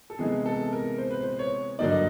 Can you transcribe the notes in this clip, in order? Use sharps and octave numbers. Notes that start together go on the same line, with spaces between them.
A4
C3 E3 G#3 B3 D#4 G#4
A4
A#4
C5
B4
C5
C#5
G2 D3 F#3 A#3 D#4 D5
D#5